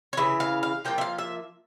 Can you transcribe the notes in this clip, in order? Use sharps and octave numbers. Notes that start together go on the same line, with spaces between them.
C#5
C#3 E3 E5
F5
F5
F3 A#3 F4 G5
E5
F5
E5